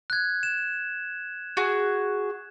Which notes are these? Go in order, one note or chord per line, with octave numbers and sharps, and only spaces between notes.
F#6 G#6
E7
F#4 G#4